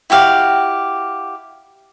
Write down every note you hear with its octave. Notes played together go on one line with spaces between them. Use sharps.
E4 F#4 G4 F5